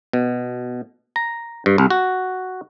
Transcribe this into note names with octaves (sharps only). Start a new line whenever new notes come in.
B2
A#5
G2
C2
F#4